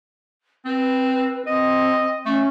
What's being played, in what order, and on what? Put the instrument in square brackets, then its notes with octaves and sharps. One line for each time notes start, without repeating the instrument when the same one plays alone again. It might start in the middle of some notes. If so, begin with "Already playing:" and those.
[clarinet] C4 [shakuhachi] B4
[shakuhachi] C4 [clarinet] D#5
[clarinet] A3 [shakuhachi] C#4